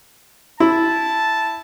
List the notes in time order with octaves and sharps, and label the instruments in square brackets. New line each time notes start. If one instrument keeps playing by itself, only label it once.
[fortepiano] E4 [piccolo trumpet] A5